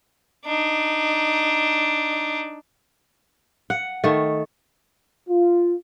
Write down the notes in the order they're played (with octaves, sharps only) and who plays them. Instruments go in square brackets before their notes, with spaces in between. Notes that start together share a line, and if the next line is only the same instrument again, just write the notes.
[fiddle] D4 D#4
[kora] F#5
D#3 A3
[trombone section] F4